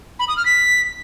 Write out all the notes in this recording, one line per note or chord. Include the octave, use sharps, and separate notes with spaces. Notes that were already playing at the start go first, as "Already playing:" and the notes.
B5
D#6
F6
B6